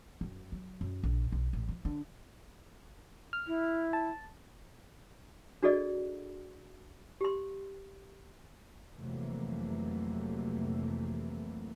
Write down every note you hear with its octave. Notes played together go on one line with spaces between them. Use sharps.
F#2
F#3
F#2
A#1
B1
A1
F3
D3
F6
E4
A5
D4 F#4 G#4 A4 D5 D#5
G4 C6
F2 C3 E3 F#3 A3 A#3